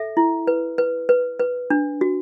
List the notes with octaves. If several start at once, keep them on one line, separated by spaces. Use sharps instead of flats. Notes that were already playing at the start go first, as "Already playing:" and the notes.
Already playing: A4 E5
E4
B4
B4
B4
B4
D4
F#4